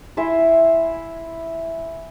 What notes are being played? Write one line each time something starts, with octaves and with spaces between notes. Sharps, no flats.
E4 E5 G#5 C6